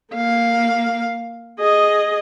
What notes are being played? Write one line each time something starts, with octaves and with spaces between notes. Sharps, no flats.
A#3 F5
G#4 D#5